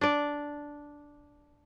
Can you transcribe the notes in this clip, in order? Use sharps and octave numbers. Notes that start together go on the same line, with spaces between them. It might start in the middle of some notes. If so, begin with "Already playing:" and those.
D4 D5